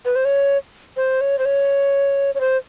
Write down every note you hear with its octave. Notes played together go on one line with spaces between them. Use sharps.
B4
C5
C#5
C5
C#5
C5
C#5
C#5
C5